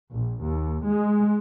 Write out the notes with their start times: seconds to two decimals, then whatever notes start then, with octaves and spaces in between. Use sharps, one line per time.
0.10 A#1
0.42 D#2
0.84 G#3